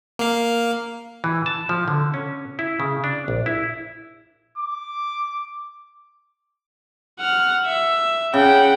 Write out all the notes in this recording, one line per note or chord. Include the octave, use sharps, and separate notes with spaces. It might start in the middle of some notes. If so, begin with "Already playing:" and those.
A#3 F5
E3
A5
F3
D3
C#4
E4
C#3
D4
A#1
E4
D6
F#5 F6
E5
C#3 F#5 G5